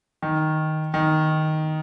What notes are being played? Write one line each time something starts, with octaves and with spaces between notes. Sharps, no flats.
D#3
D#3